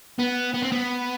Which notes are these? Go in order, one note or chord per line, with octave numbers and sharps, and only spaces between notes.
B3
B3
C4
B3